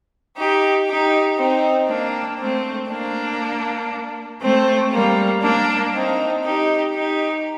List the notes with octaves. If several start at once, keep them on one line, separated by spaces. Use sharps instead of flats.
D#4 G4
D#4 G4
C4 D#4
A#3 D4
A3 C4
A#3 D4
A3 C4
G3 A#3
A#3 D4
C4 D#4
D#4 G4
D#4 G4